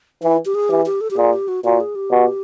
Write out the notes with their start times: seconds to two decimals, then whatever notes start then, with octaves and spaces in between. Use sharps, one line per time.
0.23 E3 E4
0.45 G4
0.55 G#4
0.69 E3 G4
0.86 G4
1.01 A4
1.11 G4
1.17 A#2 G#4
1.33 G4
1.48 F#4
1.64 A#2 F#4
1.80 G#4
1.95 G4
2.11 B2